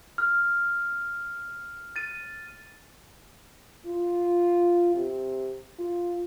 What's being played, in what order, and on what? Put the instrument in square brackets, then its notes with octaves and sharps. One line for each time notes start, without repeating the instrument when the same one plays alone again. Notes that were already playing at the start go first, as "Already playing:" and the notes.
[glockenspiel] F6
A6 D#7
[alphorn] F4
C3
F4